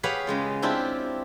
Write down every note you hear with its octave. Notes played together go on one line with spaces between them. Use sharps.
G4 G#4 B4 C#5 F5 F#5
C#3 G#3 F4
C4 D4 E4 F4 G4